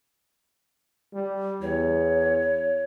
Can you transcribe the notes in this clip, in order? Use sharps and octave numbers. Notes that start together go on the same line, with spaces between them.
G3
E2 C#5